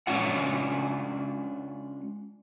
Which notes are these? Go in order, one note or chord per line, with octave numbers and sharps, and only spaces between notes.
G#3 C#4 D4 F4 F#5